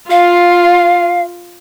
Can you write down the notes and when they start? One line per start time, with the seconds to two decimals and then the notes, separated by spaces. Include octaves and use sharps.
0.11 F4 F5